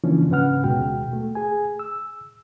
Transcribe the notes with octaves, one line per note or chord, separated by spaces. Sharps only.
C#3 E3 F3 A#3 C#4 D4
G#2 C#3 C#4 B4 F#5 F6
D#2 B2 G#3 F#4 G5
A3
G#4 G#5
E6